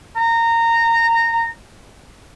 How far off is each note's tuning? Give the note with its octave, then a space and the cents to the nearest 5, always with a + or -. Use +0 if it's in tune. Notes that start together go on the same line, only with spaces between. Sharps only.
A#5 -20